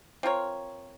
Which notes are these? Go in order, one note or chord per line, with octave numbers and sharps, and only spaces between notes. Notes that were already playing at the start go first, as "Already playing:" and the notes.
C4 F4 A#4 C#5